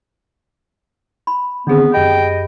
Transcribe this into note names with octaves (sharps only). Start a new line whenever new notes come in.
B5
D3 D#3 B3 C4 D4 G#4
F#2 G4 D#5 G5 B5